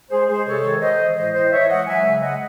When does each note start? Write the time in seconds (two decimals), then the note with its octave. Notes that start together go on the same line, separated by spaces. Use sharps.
0.10 G#3 G#4 C5
0.29 G#3 G#4 C5
0.46 C3 A4 C#5
0.63 D#3
0.81 G#3 C5 D#5
0.99 E3
1.16 A2 C5 D#5
1.34 A2 C5 D#5
1.51 E3 C#5 E5
1.69 G#3 D#5 F#5
1.87 F#3 E5 G#5
2.04 C#3
2.22 G#3 D#5 F#5